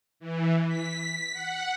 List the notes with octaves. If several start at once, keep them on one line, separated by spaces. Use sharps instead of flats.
E3
B6
F#5